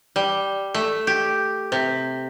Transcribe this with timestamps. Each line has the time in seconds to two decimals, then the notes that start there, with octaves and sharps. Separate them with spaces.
0.16 G3
0.74 A3
1.07 G4
1.72 C3